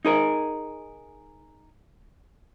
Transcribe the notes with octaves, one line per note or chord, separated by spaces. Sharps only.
D#4 G#4 A#4